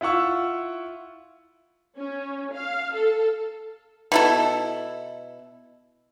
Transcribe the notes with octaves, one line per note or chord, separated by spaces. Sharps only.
E4 F4 F#5 C#6 E6
C#4
F5
A4
B2 E4 A4